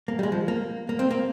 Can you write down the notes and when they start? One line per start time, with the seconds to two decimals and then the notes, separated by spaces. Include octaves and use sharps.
0.08 A#3
0.19 G3
0.23 G#3
0.32 F3
0.48 A#3
0.89 A#3
0.99 C4
1.11 A#3